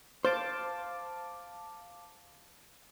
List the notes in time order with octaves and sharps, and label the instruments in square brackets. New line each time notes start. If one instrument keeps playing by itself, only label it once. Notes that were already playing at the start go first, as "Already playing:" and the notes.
[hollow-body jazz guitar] C5 [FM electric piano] F5 A5 D6